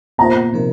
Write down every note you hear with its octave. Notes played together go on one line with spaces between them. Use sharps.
A#2 A#3 F4 C5 A#5
C3 F3 D#4 A#4